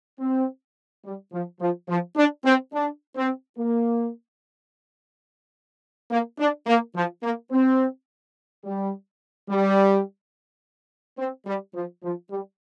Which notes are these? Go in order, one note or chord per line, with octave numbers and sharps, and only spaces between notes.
C4
G3
F3
F3
F3
D4
C4
D4
C4
A#3
A#3
D4
A#3
F3
A#3
C4
G3
G3
C4
G3
F3
F3
G3